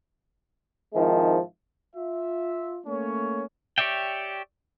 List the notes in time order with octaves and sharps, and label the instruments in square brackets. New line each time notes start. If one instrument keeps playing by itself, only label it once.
[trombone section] G#2 D#3 F3 G#3 C4 E4
[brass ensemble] F4 E5
A3 A#3 C#4 C#5
[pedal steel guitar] G4 C#5 D5 E5 G5